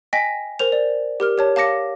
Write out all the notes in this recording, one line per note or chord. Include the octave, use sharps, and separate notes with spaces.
D#5 G5 G#5 A#6 B6
A#4 C5 F7
D5
G4 A#4 F6
G4 C#5 A5
F5 A5 D6 A#6 C#7